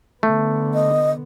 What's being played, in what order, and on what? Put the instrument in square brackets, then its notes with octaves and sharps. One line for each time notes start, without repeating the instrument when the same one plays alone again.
[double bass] D3 B3 [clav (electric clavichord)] A3
[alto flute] D#5